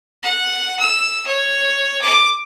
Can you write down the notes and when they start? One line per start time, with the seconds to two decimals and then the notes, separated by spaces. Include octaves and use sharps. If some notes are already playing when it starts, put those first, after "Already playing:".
0.23 F#5
0.79 E6
1.27 C#5
2.02 D6